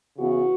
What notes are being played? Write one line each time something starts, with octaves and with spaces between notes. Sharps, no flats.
C#3 E3 B3 F#4